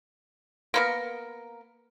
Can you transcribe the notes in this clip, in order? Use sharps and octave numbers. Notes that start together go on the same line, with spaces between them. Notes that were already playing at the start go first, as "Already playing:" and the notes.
A#3 B3 A#4